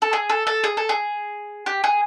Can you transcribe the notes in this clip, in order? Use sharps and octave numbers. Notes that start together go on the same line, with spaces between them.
A4
G#4
A4
A4
G#4
A4
G#4
G4
G#4